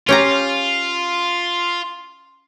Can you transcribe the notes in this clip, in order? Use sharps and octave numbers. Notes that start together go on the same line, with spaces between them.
C#4 F4 G4 A#5